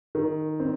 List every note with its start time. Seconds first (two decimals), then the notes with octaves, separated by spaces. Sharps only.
0.15 D#3
0.60 C4